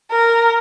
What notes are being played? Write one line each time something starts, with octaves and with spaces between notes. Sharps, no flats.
A#4